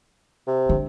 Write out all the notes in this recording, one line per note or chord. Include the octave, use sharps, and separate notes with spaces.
C3
D3